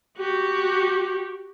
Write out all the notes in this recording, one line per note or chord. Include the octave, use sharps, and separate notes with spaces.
F#4 G4